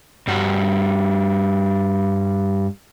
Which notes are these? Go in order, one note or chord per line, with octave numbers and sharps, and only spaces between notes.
G2 G3 F#4